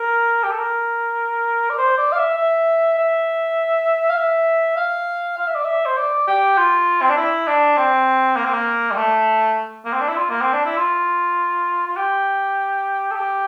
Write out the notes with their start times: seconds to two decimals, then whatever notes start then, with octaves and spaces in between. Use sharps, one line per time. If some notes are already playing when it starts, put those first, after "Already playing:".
Already playing: A#4
0.44 G4
0.51 A4
0.58 A#4
1.70 D5
1.78 C5
1.97 D5
2.12 F5
2.17 E5
2.38 E5
2.98 E5
4.09 F5
4.17 E5
4.77 F5
5.38 F5
5.47 E5
5.55 D5
5.65 E5
5.86 C5
5.97 D5
6.28 G4
6.58 F4
7.02 C4
7.09 D4
7.17 E4
7.47 D4
7.77 C4
8.36 A#3
8.45 C4
8.54 A#3
8.91 G3
8.97 A3
9.85 A#3
9.93 C4
10.01 D4
10.08 E4
10.17 F4
10.30 A#3
10.41 C4
10.53 D4
10.65 E4
10.77 F4
11.87 F4
11.97 G4
13.11 A4
13.16 G4